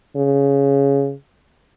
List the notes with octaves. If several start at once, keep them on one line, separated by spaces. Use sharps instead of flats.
C#3